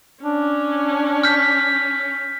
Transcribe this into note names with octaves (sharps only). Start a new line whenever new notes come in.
C#4 D4
F6 G6 B6